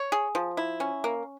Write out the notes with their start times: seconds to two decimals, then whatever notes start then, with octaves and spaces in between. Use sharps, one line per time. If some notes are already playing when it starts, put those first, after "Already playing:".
Already playing: C#5
0.12 G#4
0.35 F3
0.57 E4
0.80 C#4
1.04 A#3